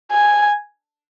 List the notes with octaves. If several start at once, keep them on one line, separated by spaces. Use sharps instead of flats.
G#5